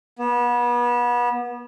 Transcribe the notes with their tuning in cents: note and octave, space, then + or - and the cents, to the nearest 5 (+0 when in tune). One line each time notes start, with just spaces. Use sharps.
B3 -30